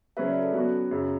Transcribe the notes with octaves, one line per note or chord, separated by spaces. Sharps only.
C#3 F#3 C#4 F#4 B4 E5
D5
A4
F#3 B3 C#4 F#4
F#2 C#3 F#3